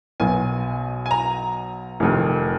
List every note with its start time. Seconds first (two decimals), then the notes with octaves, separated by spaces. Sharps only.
0.20 B1 B2 F#3 G#5
1.06 G#5
1.11 A#5
2.00 F1 F2 D#3